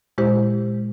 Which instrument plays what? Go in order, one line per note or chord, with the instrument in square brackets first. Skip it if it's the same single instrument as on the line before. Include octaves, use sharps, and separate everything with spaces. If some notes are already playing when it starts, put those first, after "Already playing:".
[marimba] A#2 G#3 E4 G4 C5